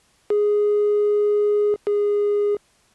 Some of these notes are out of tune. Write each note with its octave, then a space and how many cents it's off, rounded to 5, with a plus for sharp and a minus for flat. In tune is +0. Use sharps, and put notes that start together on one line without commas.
G#4 +0
G#4 -15